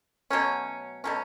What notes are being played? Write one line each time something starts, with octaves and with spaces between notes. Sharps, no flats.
B2 F#3 A3 C#4
B2 F#3 A3 C#4